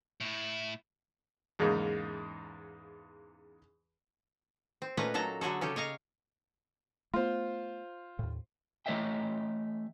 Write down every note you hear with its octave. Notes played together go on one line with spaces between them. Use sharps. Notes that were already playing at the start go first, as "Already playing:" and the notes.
A2 E4
E2 G#2 C#3 A#3 D#4
C4
A#2 A3 C#4 B4 D#5 A#5
A#2 F#3 A4 A5 A#5
D3 F#3 F#4 G#4 A4
C#3 C#4 G4 A4
C#5 D#5 F5 A#5
A3 B3 F4 C5
D#2 A2
E3 A3 C#5 D#5 E5 G5